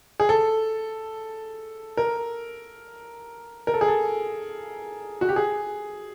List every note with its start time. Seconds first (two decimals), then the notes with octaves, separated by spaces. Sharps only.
0.20 G#4
0.29 A4
1.97 A#4
3.67 A#4
3.74 A4
3.81 G#4
3.88 A4
5.21 F#4
5.29 G4
5.36 G#4